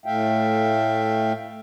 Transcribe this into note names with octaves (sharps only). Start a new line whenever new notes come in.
A2 A3 E5 F5 G5